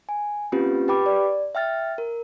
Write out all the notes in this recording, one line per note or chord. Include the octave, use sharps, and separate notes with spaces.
G#5
A#3 C4 C#4 F4 G4 B4
G4 B4 G5 B5 D6
D5
E5 G5 F6 A6
A#4